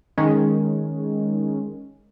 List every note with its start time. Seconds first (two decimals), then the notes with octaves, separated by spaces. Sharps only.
0.18 D#3 G#3 C#4